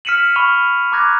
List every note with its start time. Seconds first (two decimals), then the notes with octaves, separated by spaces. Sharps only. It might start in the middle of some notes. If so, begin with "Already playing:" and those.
0.05 F6 B6 C#7 D#7 E7 F#7
0.36 B5 C#6 F6 D#7 F7
0.92 A#5 D6 F6 F#6 G#6 A#6